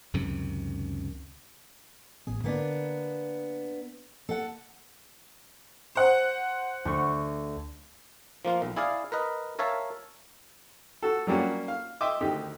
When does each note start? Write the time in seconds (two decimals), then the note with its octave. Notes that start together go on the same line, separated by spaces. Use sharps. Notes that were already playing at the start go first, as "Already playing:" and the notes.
0.14 C#2 F#2 C3 D#3
2.27 A1 A2 B3 G#4
2.44 D3 A#3 B3 D4
4.29 A#3 A4 F#5
5.95 C5 F#5
6.85 D2 C#6
8.45 F3 A#3 F4
8.62 B1
8.76 E4 G#4 D5 F5
9.12 A#4 B4 D#5
9.59 A#4 C#5 E5 F5 A5
11.03 F#4 A4
11.27 F#3 G3 A#3 C#4 F#4
11.68 F5
12.01 D#5 E5 G5 C6 D6
12.21 D2 D#3 G4